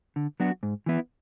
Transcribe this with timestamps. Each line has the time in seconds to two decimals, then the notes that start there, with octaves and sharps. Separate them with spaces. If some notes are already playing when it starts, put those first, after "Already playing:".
0.16 D3
0.40 F#3 B3 D4 F#4
0.63 G#2
0.86 E3 B3 E4